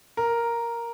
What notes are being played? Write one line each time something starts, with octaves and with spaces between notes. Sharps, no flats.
A#4